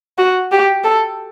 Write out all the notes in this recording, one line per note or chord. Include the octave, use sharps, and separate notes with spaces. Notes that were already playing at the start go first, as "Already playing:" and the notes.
F#4
G4
A4